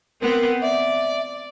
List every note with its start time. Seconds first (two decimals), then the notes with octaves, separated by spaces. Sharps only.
0.21 B3 C4 A#4
0.61 D5 E5